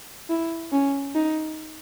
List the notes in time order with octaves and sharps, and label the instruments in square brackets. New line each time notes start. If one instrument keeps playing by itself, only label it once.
[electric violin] E4
C#4
D#4